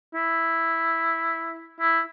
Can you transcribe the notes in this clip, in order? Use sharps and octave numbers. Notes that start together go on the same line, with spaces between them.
E4
E4